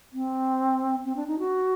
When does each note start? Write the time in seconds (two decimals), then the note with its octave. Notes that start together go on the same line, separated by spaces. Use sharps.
0.13 C4
1.05 C4
1.16 D4
1.27 D#4
1.39 F#4